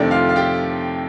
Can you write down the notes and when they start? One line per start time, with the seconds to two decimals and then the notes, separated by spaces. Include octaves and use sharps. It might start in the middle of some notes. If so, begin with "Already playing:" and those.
Already playing: F2 C3 D#3 A3 D4 D5
0.11 F4 F5
0.29 F5
0.36 G4 G5